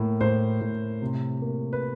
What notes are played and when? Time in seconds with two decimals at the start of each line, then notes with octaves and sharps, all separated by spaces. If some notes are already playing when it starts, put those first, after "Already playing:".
Already playing: A2 A#3
0.21 A2 C5
0.61 A2
1.02 C3
1.42 A#3
1.73 B4